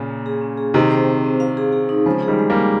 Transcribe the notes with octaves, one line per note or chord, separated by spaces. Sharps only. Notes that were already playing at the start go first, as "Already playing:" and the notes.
Already playing: A#2 C#3
A#3
G#4
C#4
G#4
C3 D#3 C4
C5
C4
C4
F5
G#4
G#4
D#4
C#3 F3 G#3
G#4
D#3 G3
G#3
G3 A#3
G#4